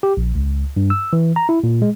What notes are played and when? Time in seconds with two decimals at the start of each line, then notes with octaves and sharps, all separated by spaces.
0.03 G4
0.17 A#1
0.35 C#2
0.77 G2
0.90 E6
1.13 E3
1.36 A#5
1.49 E4
1.64 A#2
1.82 G#3